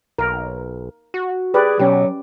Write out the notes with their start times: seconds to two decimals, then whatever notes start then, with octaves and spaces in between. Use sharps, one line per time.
0.18 B1 A#4
1.14 F#4
1.54 G4 G#4 B4 D5
1.79 B2 F#3 C#4 G4